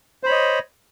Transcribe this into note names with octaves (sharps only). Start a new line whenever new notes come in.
C5 C#5 D#5 B5